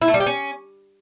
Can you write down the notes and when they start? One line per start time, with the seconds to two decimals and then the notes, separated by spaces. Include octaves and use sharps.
0.02 E4
0.08 A3
0.14 G3
0.20 G4
0.26 C#4